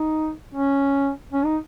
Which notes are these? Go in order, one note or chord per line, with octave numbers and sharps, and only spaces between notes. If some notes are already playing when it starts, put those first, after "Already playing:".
Already playing: D#4
C#4
C#4
D#4